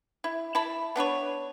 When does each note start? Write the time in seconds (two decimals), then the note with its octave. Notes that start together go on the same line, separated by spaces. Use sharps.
0.24 E4
0.55 E4 A5 B5
0.96 B3 D4 B4 C#5